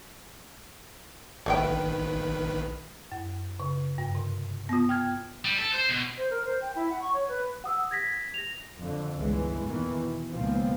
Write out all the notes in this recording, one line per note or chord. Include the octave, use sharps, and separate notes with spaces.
A#1 D#3 A3 D#4 B4 G5
F#2
C#3
G2
C3
B3 F4
G5 F6 G#6
G3
A4
C5
B2
C5
A#4
C5
G5
E4
F#5
C#6
C#5
B4
F#5 D#6 E6
G#6 A#6 B6
A#6 F7
F2 D3
G1 C#2 E3 G#3
E2 A#2 D#3 E3
B2
C#2 A#2 D#3 F3 B3 C4